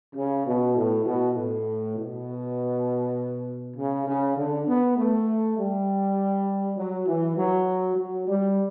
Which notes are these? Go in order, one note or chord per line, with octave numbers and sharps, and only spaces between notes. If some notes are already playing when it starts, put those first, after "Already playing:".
C#3
B2
A2
B2
A2
B2
C#3
C#3
D3
B3
A3
G3
F#3
E3
F#3
F#3
G3